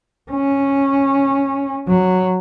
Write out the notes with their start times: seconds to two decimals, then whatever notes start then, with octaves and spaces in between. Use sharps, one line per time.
0.31 C#4
1.88 F#3